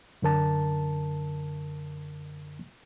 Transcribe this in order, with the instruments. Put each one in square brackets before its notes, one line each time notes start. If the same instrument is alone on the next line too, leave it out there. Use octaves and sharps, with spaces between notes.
[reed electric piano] F#2 D3 A#4 A5